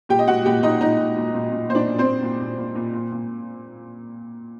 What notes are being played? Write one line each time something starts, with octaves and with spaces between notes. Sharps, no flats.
A#2 G4 G5
D#5
A#2 F#4 F#5
A#2 G4 G5
A#2 D#4 D#5
A#2 D#4 D#5
A#2
A#2
A#2
A#2
A#2 C5
D4 D5
A#2
C4 C5
A#2
A#2
A#2
A#2
A#2
A#2
A#2